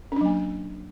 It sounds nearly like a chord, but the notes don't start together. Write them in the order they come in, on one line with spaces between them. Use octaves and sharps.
C#4 D4 F#3 A#3